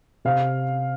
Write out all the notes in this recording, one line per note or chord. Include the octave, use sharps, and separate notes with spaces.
C3 F5